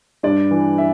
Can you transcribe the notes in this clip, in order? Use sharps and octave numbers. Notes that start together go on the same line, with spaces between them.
G2 D4 D5
E3
E5